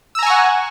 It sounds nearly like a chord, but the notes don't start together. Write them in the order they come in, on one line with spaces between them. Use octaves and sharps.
E6 A#5 G#5 C#6 F#5